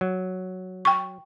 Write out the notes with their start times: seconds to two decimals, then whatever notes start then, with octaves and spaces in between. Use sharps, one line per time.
0.01 F#3
0.85 G5 C#6